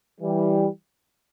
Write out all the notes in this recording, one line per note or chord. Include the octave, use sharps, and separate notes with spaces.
E3 G3